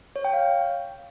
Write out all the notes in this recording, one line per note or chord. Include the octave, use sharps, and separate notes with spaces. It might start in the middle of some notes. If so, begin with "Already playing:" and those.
C#5
G5
F5